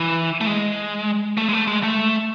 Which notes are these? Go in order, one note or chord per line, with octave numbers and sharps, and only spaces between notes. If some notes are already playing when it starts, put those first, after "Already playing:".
Already playing: E3
A3
G#3
A3
G#3
A3
G#3
A3